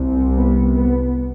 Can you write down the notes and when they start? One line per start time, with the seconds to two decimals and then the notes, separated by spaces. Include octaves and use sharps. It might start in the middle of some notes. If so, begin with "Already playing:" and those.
Already playing: C2 C3
0.37 B3
0.76 B3